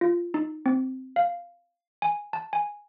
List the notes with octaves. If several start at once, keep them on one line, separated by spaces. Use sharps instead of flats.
F4
D#4
C4
F5
G#5
A5
G#5